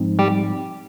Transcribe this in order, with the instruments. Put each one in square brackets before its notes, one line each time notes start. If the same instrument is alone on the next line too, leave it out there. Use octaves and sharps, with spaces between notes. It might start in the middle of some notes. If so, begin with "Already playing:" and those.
Already playing: [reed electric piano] G#2 F3 G#3 C4 D#4
[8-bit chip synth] G3 G4